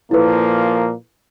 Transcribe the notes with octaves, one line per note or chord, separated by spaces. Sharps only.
A#2 F3 A#3 E4 A4 B4